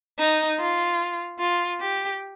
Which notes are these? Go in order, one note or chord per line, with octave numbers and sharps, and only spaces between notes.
D#4
F4
F4
G4